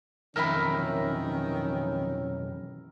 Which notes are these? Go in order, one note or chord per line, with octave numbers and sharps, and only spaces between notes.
B1 F2 D#3 E3 C#4 A#4 E5 B5